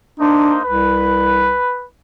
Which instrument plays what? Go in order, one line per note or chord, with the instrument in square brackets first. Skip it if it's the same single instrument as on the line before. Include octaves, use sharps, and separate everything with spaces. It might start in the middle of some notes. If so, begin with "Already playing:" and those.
[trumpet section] A#3 D#4 C5 [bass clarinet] D4
[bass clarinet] C2 [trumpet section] B4